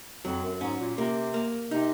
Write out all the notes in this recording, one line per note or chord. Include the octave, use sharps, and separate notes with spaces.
F2 F#3
F#2
F#2
G#2 C#4
A#2
C3 A#3
A#3
C3 D#4